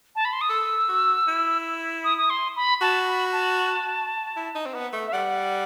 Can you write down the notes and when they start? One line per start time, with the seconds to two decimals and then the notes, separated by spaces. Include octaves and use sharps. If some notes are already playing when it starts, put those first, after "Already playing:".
0.16 A5
0.25 B5
0.33 C6
0.41 D#6
0.49 A4 E6
0.89 F#4
1.27 E4
2.04 D#6
2.18 D#6
2.30 C6
2.56 B5
2.81 F#4 A5
3.07 B5
3.33 A5
4.36 E4
4.55 D#4
4.66 C4
4.74 B3
4.93 A3
5.07 E5
5.13 G3 F#5